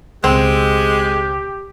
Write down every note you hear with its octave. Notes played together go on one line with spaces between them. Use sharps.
C#2 B2 G#3 C4 G4